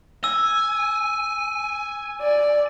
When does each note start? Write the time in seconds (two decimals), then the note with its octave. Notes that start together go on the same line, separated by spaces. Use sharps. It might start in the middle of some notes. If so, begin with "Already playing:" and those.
0.24 G#5 E6
2.21 D5